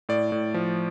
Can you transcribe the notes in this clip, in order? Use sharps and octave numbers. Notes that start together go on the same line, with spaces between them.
A2 D5
A2
F3